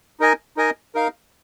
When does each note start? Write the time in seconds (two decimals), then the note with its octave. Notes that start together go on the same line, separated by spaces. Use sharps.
0.20 D#4 A#4 D#5 G#5
0.57 D#4 A#4 D#5 G#5
0.95 D#4 A#4 F5